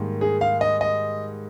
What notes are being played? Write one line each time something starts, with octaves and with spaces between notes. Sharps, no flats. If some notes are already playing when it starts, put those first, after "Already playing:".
Already playing: G#2 D#3 G3 A#3
G#4
F5
D#5
D#5